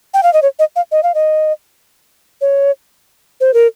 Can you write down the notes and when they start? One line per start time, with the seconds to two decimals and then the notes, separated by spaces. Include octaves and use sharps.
0.14 G5
0.23 F5
0.33 D#5
0.42 C#5
0.59 D#5
0.76 F5
0.91 D#5
1.03 F5
1.14 D#5
2.41 C#5
3.40 C5
3.54 A#4